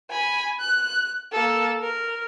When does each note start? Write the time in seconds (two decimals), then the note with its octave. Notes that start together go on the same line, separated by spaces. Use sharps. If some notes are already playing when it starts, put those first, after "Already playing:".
0.10 G#5 B5
0.60 F#6
1.32 A#3 A4
1.82 A#4